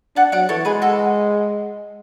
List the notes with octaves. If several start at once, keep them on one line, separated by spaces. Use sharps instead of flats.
D4 F#5 A5
F#3 D5 F#5
E3 A4 C#5
G#3 G#4 B4
F#4 A4